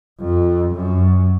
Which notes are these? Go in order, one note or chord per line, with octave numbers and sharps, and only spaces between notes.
F2
F#2